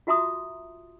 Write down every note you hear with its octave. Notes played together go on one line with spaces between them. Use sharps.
F4 F#4 E5 A#5 C6 D#6